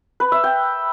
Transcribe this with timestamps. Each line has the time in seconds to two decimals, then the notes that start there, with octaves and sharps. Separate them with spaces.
0.20 B4
0.32 E5
0.44 G5